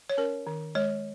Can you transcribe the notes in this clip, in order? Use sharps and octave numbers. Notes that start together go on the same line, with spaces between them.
C#5
C#4 A#4
D#3
G#3 C#5